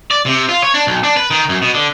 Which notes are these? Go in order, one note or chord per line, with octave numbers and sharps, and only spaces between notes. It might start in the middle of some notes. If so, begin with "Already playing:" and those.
D5
C3
F4
C#5
D4
B1
D4
B4
D#3
F#2
B2
D3